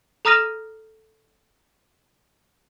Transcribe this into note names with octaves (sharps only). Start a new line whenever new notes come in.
A4 A#5 D#6 F6 A#6 D#7